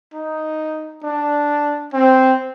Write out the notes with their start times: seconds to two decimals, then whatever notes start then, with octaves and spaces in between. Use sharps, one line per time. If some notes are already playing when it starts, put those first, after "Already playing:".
0.14 D#4
1.03 D4
1.93 C4